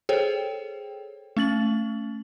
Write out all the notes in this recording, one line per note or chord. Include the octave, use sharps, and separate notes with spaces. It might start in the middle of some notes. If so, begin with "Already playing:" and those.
G#4 A4 C5 C#5 G5
A3 C#4 A6 F#7